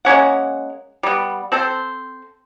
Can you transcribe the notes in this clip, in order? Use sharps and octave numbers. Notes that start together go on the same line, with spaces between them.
G#3 A#3 C#4 F#5
G3 B3
C4 A4 C5